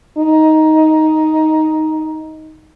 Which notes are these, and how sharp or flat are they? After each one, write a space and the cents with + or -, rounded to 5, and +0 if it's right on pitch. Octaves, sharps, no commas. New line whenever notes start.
D#4 +10